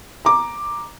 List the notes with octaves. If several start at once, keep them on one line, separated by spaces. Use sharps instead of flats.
A#5 D6